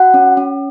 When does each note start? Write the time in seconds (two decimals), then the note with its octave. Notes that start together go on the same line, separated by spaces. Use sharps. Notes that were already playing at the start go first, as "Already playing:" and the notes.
Already playing: F#4 F#5
0.14 C#4
0.37 C#4